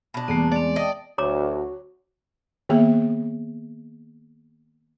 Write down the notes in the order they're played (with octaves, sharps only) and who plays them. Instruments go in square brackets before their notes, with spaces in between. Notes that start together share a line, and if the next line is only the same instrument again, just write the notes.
[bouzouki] B2 D4
[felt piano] E2 [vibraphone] G3 A3 A#3
[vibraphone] G#3 C4 [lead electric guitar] D5
[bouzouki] D#5 [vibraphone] G5 A5
[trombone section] D2 [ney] F#4 [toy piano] C#5 A#5 D6
[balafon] D#3 A#3 B3 G#4 E5